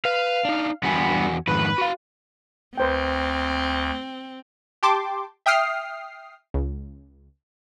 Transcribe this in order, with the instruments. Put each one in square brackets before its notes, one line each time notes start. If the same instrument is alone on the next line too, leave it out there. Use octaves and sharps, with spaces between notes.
[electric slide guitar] B4 [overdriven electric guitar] F5
[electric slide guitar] D4 D#4
[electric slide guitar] E2 F#4 G#5 [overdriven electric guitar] G2 B3
[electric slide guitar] F2 G#2 D#3 [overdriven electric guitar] B4
[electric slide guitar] F#4 F5
[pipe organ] D2 [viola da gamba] C4 [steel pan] B4 C5 G5
[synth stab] G4 G5 A5 C6 D6
E5 G5 D#6 F6 C7
C#2